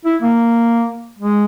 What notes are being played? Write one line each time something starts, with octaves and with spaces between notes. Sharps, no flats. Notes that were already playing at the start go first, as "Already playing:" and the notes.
E4
A#3
G#3